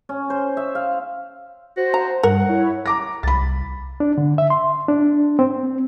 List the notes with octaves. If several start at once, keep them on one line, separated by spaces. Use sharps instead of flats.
C#4
C5
E5
F5
F#4 C5
A#5
G2 A#4 F#5
E4 C#5
A#5 D6 A#6
C2 B5 A6
D4
D3
E5
C6
D4
C4